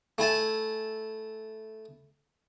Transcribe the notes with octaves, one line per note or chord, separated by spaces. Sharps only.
A3 E4 G#5 A5